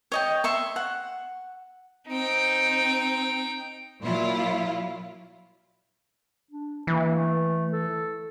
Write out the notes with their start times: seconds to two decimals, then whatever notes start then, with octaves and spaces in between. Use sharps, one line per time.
0.12 C#5 D#5 G5
0.44 E5 C6 C#6
0.76 F#5
2.08 C4 D#4 G5
4.03 A#2 F#3 E4 F4
6.51 D4
6.87 E3 A#3
7.14 A3
7.73 A4